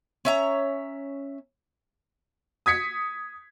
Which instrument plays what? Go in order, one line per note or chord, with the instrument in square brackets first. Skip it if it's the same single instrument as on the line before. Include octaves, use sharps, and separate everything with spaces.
[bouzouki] C#4 E5 A#5
[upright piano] D#6 G#6 B6 C#7